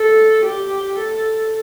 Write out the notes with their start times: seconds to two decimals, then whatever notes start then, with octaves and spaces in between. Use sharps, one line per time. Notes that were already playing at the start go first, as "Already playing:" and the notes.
Already playing: A4
0.45 G4
0.99 A4